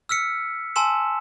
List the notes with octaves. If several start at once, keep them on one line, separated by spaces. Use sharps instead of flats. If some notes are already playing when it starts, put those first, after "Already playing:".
E6 F6 B6 C#7
G#5 A5 C6 E6 E7